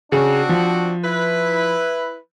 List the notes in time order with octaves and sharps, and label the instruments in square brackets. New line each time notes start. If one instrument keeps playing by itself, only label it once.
[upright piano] C#3 [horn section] C4 D4 F#4
[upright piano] F3
[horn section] E4 B4